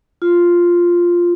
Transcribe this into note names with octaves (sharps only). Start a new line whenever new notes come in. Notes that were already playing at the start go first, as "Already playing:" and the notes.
F4